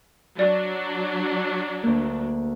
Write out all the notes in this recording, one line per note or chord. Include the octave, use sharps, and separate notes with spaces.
F#3 D4 D5
D2 A#3